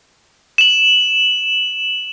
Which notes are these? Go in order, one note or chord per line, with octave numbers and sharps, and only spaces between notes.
E7 F#7